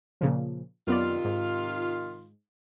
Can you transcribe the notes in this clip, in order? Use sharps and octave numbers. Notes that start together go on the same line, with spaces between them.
A#2 C#3 F3
F#2 C3 D#3 B3 F4 D5
G#2